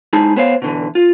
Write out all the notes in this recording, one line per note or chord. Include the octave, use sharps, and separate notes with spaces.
G#3 D#4 E4 G#4 A5
B3 C5 C#5 F5
B2 D3 E3
F4